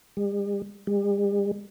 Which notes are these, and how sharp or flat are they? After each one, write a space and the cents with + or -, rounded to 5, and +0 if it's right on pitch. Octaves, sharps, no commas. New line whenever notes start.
G3 +45
G3 +45